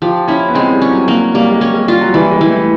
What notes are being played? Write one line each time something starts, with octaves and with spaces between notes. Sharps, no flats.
F3 G4
C#4 E4
B3
G#3 C4
G3
C#4
F#3
F#3 A#3
G3 A#3
G#3
G3 C#4
G#3
G3 F4
F#3
E3 G3
G#3
E3
A3